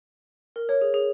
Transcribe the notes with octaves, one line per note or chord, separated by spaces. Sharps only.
A#4
C#5
G#4
G#4